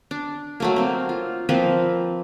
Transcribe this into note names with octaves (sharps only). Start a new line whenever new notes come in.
D4
F#3 A3 A#3
A#3 C4
F4
F3 A#3 C4 B4